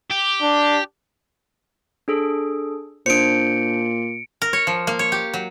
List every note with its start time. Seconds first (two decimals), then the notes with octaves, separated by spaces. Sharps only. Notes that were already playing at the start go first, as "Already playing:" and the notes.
0.10 G4
0.42 D4
2.08 D4 G#4 A4
3.06 A#2 D4 C5 C#7 D7
4.42 A#4
4.53 C#5
4.67 F3
4.87 A#3
4.99 C#5
5.12 G4
5.34 F#3